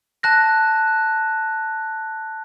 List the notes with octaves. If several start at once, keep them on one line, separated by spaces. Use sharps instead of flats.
A5 F#6 A#6